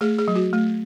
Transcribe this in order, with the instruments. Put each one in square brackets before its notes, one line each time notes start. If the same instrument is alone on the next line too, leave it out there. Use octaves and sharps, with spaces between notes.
[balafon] A3 G#4
G#4
F#3
F#4
A3